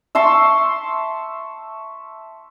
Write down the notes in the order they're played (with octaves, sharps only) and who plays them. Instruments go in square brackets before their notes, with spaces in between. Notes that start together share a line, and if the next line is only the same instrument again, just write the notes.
[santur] E5 A5 C6 C#6